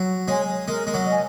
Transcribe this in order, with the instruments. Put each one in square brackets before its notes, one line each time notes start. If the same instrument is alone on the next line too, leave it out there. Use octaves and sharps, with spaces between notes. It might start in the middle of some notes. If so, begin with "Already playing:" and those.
Already playing: [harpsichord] F#3
[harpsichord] G#3 [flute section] C#5 G#5 C6
[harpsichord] G#3 [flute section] A#4
[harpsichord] G#3
F#3
[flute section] D#5 G#5